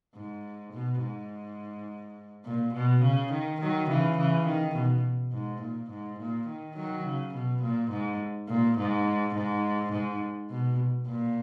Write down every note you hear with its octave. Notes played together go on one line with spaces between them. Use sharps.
G#2
B2
G#2
A#2
B2
C#3
D#3
D#3 F#3
C#3 E3
C#3 E3
D#3
B2
G#2
A#2
G#2
A#2
D#3
D#3 F#3
C#3
B2
A#2
G#2
A#2
G#2
G#2
G#2
B2
A#2